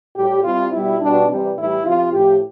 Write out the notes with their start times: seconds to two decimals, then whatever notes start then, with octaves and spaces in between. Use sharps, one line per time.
0.16 A2 G3 G4
0.44 C3 G3 F4
0.72 B2 G3 E4
1.01 B2 G3 D4
1.28 C3 E3 G3
1.57 A2 E3 G3 E4
1.85 C3 F3 F4
2.14 A2 F3 G4